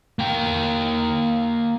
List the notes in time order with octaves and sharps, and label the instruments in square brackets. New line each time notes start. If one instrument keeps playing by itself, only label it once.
[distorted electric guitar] A#3 G5